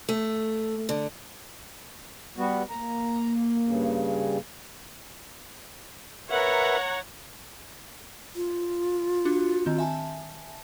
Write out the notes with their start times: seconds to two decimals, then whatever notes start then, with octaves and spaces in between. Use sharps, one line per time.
0.09 A3
0.89 D3
2.37 G3 B3 F#4
2.70 A#3 A#5
3.65 G2 C#3
6.31 A#4 B4 C#5 E5 F#5 A#5
8.36 F4
9.25 D4 F#4
9.66 D#3 C4
9.78 E5 G#5 A5